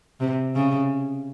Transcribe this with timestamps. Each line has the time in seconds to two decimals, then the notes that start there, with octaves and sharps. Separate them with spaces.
0.20 C3
0.55 C#3